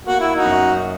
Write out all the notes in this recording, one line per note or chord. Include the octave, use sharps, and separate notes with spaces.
A#3 F#4
E4
D#4 F#4
F#2